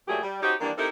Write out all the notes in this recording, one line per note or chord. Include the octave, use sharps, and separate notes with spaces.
A#2 F#3 G3 A3 G4 G#4
G3
C#4 D#4 F#4 G4 C5 D#5
D#3 E3 G3 A#3 D4
C4 D#4 E4 G4 A4 A#4